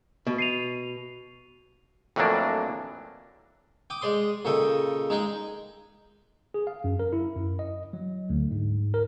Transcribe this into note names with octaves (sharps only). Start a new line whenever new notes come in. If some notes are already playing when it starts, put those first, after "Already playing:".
B2
C7 D#7 F7
F2 A2 E3 F#3 A#3 D4
G5 D6 D#6
G#3 D5 C6 D#6
A#2 C#3 A4 D#5 G5
G#3 D#4 G#4 G5
G#4
F5
F#2
A#4
E4
F#2
D#5
F#3
D2
G#2
A#4